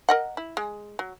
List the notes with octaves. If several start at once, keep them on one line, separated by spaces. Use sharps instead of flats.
A#4 D#5 F#5
E4
G#3
F#3